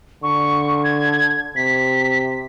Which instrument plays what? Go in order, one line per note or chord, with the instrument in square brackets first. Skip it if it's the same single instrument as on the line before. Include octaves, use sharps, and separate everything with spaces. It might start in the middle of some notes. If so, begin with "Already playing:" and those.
[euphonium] D3 [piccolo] C#6
[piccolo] G#6
[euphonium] C3 [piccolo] B6